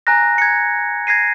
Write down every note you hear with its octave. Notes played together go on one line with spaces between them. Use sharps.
G#5 A#5 F#6 A#6
G#6 C#7
G#6 A#6 C7 D#7